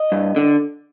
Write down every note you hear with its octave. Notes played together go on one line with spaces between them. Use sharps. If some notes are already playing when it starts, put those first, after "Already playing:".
Already playing: D#5
G2
D3